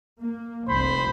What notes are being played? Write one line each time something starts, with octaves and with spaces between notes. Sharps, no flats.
A#3
F1 C2 F2 C5 B5